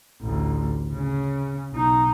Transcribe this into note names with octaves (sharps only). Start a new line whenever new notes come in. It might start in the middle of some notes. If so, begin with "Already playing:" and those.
A1 D2
C#3 C#4
B1 D#4